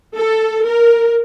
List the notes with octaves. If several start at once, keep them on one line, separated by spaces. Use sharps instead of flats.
A4
A#4